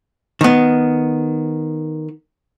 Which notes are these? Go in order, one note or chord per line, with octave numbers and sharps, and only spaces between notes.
D#3 B3